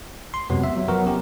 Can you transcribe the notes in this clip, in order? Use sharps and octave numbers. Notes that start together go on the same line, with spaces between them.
C6
F#2 C3 F#3 G#3 B3
E5
F#3
F3 F#3 B3 F#4 A#4
C#4 G4